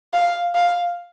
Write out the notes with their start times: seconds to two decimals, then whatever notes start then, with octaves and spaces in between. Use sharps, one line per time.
0.13 F5
0.55 F5